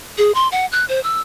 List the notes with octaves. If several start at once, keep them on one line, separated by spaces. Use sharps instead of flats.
G#4
C6
F#5
F#6
C5
E6